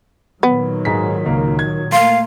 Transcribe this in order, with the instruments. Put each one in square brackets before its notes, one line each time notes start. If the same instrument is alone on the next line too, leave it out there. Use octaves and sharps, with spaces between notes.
[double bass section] A#2 D#3 F#3 [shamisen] B3
[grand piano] G#2 G#4 B6
C#2 A#3
G#6
[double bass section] A3 A#3 [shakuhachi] F5 [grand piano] C6